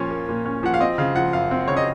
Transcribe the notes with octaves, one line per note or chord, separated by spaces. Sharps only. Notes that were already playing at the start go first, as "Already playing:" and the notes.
Already playing: A#2 F3 C#4 C#5
A#3
A#2
C#4
F3 F#5
F5
C4 D#5
C#3 F5
F3 F#5
F#2 F5
C4
C#3 C#5
D#5